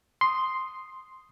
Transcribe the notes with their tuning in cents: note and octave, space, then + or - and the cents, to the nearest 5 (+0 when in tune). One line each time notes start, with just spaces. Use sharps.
C6 +0 D#6 +0